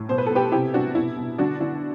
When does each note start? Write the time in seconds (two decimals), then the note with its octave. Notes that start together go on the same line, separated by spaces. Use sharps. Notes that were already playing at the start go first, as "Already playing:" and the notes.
Already playing: A2
0.09 B2 C5
0.18 B4
0.27 B2 A4
0.35 G4 B4
0.52 C3 E4 G4
0.74 C3 D4 F#4
0.95 B2 E4
1.17 B2
1.38 D3 D4 F#4
1.60 D3 E4